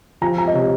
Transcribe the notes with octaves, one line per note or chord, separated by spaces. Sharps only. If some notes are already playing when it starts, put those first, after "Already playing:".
F3 A#5
A#5
D#5
C3 C#5